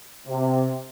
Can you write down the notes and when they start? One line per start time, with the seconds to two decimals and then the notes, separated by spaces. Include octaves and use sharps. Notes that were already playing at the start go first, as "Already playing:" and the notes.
0.27 C3